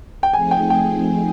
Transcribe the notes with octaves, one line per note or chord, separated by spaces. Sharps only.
G5
F3 A3 C4 D#4 G#4 G#5
G5
G5